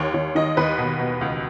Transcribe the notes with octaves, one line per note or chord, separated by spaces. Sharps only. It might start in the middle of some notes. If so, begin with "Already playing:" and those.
Already playing: D#2 C#5
D#2
D#3 D#5
D#2 B4
B2
B2
C#2